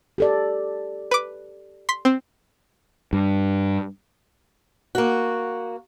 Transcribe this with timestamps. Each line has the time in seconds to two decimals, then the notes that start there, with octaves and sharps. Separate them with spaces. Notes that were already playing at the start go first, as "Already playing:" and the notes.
0.18 G4 A4 D5
1.11 B4 D6
1.89 C6 B6
2.05 C4
3.13 G2
4.95 A#3 F#4